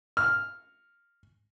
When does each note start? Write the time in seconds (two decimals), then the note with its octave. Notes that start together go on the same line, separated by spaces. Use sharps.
0.17 F6